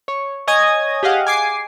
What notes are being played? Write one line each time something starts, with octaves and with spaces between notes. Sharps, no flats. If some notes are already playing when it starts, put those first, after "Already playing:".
C#5
C#5 D#5 G#5 D#6 G#6 A#6
G4 G#4 D#5 F5 F#5
G#5 D6 C7